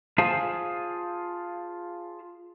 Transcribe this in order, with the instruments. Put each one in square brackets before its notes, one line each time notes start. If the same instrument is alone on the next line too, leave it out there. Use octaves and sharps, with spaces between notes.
[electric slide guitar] F4 G#4 C5 F5 G#5 A5